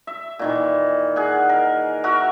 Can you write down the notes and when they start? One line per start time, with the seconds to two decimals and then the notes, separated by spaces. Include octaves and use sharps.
0.07 E5
0.39 A#2 D#3 E3
1.16 G#4 F#5
1.49 A#4
2.04 F#4 A#4 E5 F#5